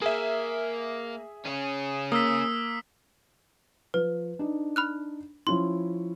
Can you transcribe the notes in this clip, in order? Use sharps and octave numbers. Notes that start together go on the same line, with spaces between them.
A#3 G#4 E5
C#4 G#4
A#3 D#6 E6 B6
F3 B4
D4 D#4
B5 F6 F#6
F3 C#4 E4 C6